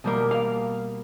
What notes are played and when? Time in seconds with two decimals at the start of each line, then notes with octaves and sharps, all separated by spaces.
0.04 B2 G3 A#3
0.31 F5